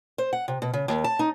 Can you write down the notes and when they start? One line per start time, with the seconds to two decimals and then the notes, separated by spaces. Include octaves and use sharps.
0.18 C5
0.33 F#5
0.48 C3
0.62 B2
0.73 C#3
0.88 D#2
1.04 A5
1.19 D#4